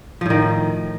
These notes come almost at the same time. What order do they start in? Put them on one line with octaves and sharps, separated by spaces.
F3 A2 D#3